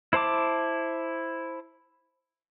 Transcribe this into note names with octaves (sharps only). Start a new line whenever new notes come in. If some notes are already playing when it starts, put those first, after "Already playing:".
E4 C5 A5 D6